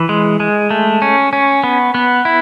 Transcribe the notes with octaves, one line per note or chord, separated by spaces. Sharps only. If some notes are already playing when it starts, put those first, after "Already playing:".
Already playing: E3
G#3
G#3
A3
C#4
C#4
B3
B3
E4